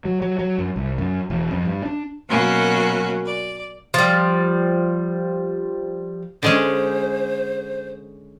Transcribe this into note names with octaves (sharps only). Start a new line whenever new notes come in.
F#3
F#3
F#3
F#2
C2
F#2
E1
F2
G2
D4
B2 F#3 A#3 C#4 F#4 A#4
D5
F3 G3
D3 G#3 C#4 C5